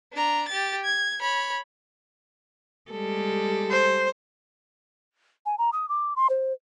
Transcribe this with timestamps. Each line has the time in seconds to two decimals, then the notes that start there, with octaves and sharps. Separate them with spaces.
0.14 D4 A#5
0.48 G4 A6
0.85 G#6
1.21 C#5 B5
2.91 G3 G#3 A4
3.71 C5
5.46 G#5
5.58 A#5
5.73 D#6
5.89 D6
6.16 C6
6.30 C5